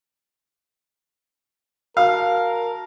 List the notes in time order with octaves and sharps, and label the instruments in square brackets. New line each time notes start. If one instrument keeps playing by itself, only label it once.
[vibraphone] F#4 A5 [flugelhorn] A#4 [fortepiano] F5